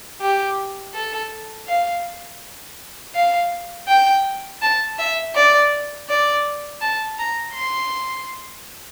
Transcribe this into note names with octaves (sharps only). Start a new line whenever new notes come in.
G4
A4
F5
F5
G5
A5
E5
D5
D5
A5
A#5
C6